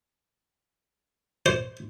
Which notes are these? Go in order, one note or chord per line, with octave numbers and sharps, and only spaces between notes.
C5